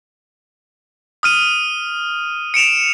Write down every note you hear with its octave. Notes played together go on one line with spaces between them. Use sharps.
D#6 F6 D#7
C#7 D7 E7 F7